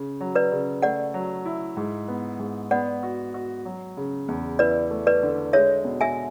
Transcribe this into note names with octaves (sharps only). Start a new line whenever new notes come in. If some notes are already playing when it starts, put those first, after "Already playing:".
Already playing: C#3
F#3
B4 D5
C#3
A3 D5 F#5
F#3
E4
G#2
B3
G#2
B3 D5 F#5
F#4
F#4
F#3
C#3
E2
E4 B4 D5
A3
B4 D5
D3
G#3 C#5 E5
B2
E5 G#5